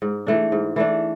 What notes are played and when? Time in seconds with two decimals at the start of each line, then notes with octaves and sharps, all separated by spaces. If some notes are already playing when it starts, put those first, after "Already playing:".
0.02 G#2
0.27 E3 A3 D4
0.52 G#2
0.76 E3 A3 D4